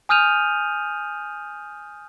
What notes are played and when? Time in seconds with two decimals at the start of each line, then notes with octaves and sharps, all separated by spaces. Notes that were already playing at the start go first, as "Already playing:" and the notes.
0.09 G#5 D#6 F6 G6 D#7 F7